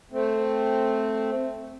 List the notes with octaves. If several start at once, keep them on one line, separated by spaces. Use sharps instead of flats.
A3 C4